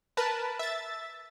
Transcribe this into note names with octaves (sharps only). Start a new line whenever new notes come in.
A#4 B4 A5
E5 A6